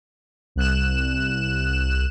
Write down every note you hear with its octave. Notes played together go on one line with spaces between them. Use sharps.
C2 F#6 E7